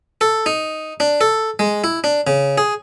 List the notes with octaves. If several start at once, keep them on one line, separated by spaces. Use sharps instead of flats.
A4
D#4
D4
A4
G#3
E4
D4
C#3
G#4